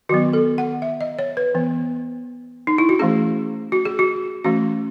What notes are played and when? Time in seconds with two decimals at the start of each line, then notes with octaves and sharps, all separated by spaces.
0.09 D#3 F#3 B3 F#4
0.33 A4
0.58 F#5
0.82 E5
1.01 D#5
1.19 C#5
1.37 B4
1.55 E3 B3
2.67 D#4
2.78 E4
2.89 F#4
2.99 E3 A3 C#4 G#4
3.72 F#4
3.85 G#4
3.99 F#4
4.44 E3 A3 C#4 F#4